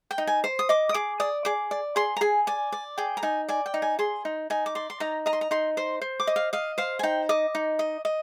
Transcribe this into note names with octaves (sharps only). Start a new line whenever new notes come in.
G5
D#4
G#5
C5
D#6
D#5 D6
D#6
G#4 D6
D5 D#6
G#4 D6
D5
G#4 C6
A#5
G#4 G#5
D5 G#5
D5
G#4 G5
A#5
D#4 G#5
D5 G#5
G5
D#4
G#5
G#4 C6
D#4
D#4 G#5
D6
D5 C6
C6
D#4 A#5
D#5 A#5
C6
A#5
D#4 C6
C5 C6
C5
D6
D#5
F5
D#5 F5
C5 F5
G#5
D#4 G5
D#5 D6
D#4
D#5
D#5